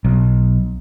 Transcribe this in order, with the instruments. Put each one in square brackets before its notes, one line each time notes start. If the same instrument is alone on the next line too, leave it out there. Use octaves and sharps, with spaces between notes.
[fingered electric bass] B1